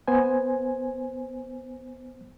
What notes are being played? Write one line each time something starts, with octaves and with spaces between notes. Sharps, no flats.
B3 C5 G#5